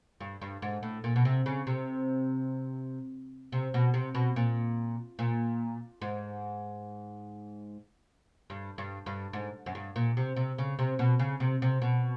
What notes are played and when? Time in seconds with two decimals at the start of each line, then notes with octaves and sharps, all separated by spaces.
0.21 G2
0.41 G2
0.62 G#2
0.83 A2
1.04 A#2
1.16 B2
1.25 C3
1.46 C#3
1.67 C3
3.52 C3
3.74 B2
3.94 C3
4.15 B2
4.36 A#2
5.19 A#2
6.02 G#2
8.50 G2
8.78 G2
9.06 G2
9.33 G#2
9.66 F#2
9.75 G2
9.96 A#2
10.17 C3
10.36 C3
10.58 C#3
10.79 C3
10.99 B2
11.19 C#3
11.40 C3
11.62 C3
11.82 B2